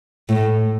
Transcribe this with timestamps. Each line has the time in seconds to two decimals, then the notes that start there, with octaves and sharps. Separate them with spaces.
0.29 A2